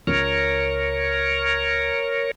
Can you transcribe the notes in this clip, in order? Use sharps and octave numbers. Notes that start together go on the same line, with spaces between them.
C#2 A#4 C#5